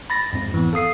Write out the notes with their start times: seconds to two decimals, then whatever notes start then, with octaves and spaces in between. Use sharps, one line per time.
0.10 B5 A6 A#6
0.33 F2 G#2 C4
0.54 E3 B3
0.73 A4 F5 D#6 C7